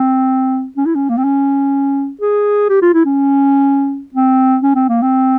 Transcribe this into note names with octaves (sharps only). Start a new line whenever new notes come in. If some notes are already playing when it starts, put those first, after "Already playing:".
Already playing: C4
C#4
E4
C#4
A#3
C4
C#4
G#4
G4
F4
E4
C#4
C4
C#4
C4
A#3
C4